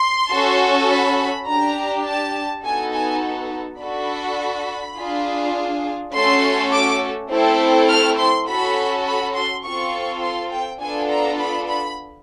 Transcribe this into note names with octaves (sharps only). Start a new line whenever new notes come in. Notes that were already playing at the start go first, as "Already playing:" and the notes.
Already playing: C6
C#4 F#4 A4
B5
D4 G4 A#5
A5
B3 D#4 F#4 A4 G#5
G#5
D4 F#4 A4 B5
D4 F4 G#4
A3 C#4 F#4 A4 C6
D6
A3 C4 E4 A4
F6
C6
C#4 F#4 A4 B5
B5
C6
C4 F4 A4 C#6
C6
G5
B3 D4 F4 A4 G#5
A#5
B5
B5